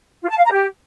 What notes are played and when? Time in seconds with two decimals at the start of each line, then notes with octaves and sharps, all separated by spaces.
0.23 F4
0.30 A5
0.37 F5
0.45 A#5
0.52 G4